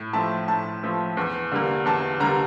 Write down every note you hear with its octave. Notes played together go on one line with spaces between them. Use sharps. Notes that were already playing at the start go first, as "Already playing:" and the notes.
Already playing: A2
F3 A3 A5
A2 A5
F3 A3
E2
D3 G3 A#3
E2 A5
D3 G3 A#3 A#5